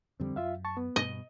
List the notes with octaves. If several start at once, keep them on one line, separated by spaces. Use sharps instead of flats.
F2 D3 G3 C4
F#2 F4 E5 F5
A5 C#6
B3
G2 B2 D#5